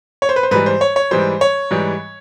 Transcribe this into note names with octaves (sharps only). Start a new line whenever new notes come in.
C#5
C5
B4
C5
G#2 E3 G3 B4
C5
C#5
C#5
G#2 E3 G3 C5
C#5
G#2 E3 G3